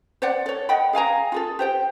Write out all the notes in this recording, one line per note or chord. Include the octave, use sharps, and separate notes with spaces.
C5 D5 F#5
A4 C#5
D#5 F#5 G5 B5
G#4 F5 G#5 A#5
F4 G#4 A4
G4 C5 G5